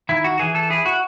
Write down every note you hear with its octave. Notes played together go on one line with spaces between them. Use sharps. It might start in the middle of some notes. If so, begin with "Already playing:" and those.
D#3 E4
F#4
E3 G#4
A4
E4 G#4
F#4